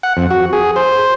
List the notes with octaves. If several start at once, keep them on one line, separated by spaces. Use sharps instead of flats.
F#5
F2
F#4
G#4
C5